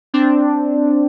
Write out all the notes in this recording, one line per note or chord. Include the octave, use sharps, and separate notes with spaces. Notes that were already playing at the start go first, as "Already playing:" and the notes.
C4 D4